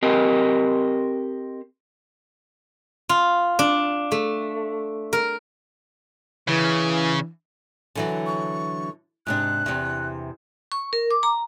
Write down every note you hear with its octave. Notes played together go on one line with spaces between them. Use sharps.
C4 G4 A#4 D#5
F4
D4
A3
A#4
C#3 E3
D3 E3 F#3
C#6
G#2 C3 D4 F#6
E2 C3
C#6
A#4
D6
A#5